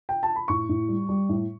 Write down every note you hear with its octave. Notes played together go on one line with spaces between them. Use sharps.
G5
A5
B5
A2 C#6
A2
G3
G3
A2